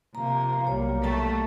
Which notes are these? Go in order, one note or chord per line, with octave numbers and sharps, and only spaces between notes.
C3 F3 A#3 A#5
B1 G3 A#3 C#5
A3 A4 A5 C#6